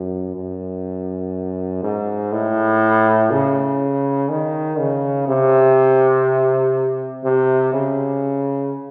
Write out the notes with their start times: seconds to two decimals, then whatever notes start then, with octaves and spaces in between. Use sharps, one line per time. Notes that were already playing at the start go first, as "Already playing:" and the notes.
Already playing: F#2
0.35 F#2
1.83 G#2
2.32 A2
3.31 C#3
4.29 D#3
4.79 C#3
5.28 C3
7.25 C3
7.73 C#3